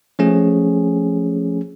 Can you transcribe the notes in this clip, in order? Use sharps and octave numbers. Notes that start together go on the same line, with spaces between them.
F3 A3 C#4 G#4